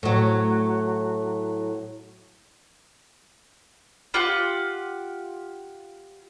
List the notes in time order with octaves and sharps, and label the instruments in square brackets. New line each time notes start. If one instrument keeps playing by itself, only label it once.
[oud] A2 F#3
[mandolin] F4 G4 F#5